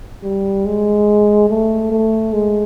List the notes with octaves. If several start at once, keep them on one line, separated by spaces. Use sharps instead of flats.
G3
G#3
A3
A3
G#3